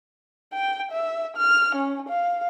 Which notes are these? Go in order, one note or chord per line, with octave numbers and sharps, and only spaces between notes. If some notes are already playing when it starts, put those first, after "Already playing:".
G5
E5
F6
C#4
F5